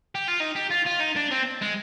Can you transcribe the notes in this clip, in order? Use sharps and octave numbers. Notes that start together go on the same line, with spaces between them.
G4
F4
D#4
G4
F4
F4
D#4
D4
C4
G#3